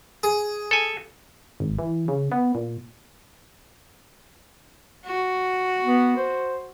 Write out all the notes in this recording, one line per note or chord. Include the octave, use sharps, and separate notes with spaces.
G#4
A4 G#5
G#1
E3
C#3
B3
A#2
F#4
B3
C5